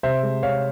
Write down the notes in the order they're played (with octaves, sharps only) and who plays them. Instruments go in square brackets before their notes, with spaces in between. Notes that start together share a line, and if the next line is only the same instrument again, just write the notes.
[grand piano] C3 C5 E5
G#3
C3 C#5 F5